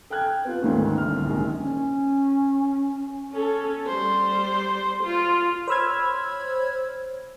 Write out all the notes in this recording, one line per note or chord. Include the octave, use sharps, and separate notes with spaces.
A4 G5 F6 F#6 G#6
B3 F4
D2 G#2 D#3 C#4
C2 D3 F6
A#1 D#3 G#3
C#4
C#4 A4
G3 C5
F4
C5 C#5 B5 E6 F6 G#6